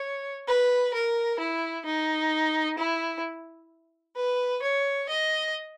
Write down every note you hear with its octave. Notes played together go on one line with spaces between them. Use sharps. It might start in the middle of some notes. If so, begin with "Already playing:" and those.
Already playing: C#5
B4
A#4
E4
D#4
E4
B4
C#5
D#5